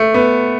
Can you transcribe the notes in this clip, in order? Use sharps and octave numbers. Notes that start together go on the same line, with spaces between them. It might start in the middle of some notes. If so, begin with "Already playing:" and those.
Already playing: A3
B3